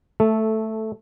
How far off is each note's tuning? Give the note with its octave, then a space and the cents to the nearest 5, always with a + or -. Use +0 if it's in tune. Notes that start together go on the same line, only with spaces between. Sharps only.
A3 +0 A4 -10